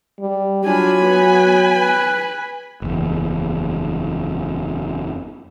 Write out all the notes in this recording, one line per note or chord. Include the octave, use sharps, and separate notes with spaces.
G3
F#3 D4 F4 G#5 B5
B3 B4
B4
F#1 E2